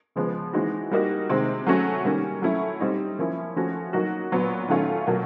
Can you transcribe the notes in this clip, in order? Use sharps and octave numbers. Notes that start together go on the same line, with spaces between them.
C#3 F3 G#3 B3
E3 G#3 C4 D#4 F#4
G3 A#3 D#4 F#4
C3 D#3 G#3 C4
F#3 A3 C#4 F#4
D#3 G3 A#3 C#4
F#3 A3 C#4 E4
G3 C4 D#4
F3 A#3 C#4 E4
F3 A3 C#4 F#4
F#3 A#3 D#4 F#4
A#2 F#3 B3
D#3 F#3 A3 C#4 F4
B2 F#3 A#3